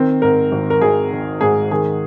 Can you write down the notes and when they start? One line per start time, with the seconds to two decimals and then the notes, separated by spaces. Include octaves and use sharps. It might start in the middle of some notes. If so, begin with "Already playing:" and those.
Already playing: D#3 C4
0.22 G#2 A#4
0.52 G#1
0.70 A#4
0.81 G#1 G#4
1.12 D#3
1.41 G#2 G#4
1.71 D#3 G#4